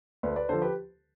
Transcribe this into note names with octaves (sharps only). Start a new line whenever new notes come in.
D2 B4 D5
B4 D5
D3 F3 A4 C5
G4 B4